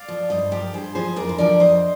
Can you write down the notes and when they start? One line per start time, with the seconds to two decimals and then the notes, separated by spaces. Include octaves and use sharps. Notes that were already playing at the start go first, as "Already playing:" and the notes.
Already playing: D5 F5
0.08 F3
0.30 G2 C5 D#5
0.51 F3 G4 A#4
0.73 G2 G#4 C5
0.95 F3 G#4 C5
1.16 F2 A#4 D5
1.29 C5
1.38 D3 F3 A#4 D5
1.60 F2 C5 D#5